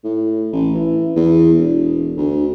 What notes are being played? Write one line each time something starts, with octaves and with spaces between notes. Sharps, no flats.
A2
A1
E3
E2
E1
D2